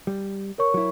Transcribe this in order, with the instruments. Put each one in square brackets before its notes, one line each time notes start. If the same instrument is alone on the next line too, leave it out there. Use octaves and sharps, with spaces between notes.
[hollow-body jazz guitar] G3
[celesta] A#4 C#5 C#6
[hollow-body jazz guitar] F#3 E4